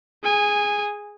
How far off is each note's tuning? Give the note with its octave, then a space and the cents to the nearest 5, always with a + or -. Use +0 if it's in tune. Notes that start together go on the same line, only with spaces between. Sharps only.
G#4 +0 G#5 -15